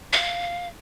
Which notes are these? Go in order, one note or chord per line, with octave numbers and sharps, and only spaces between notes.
F5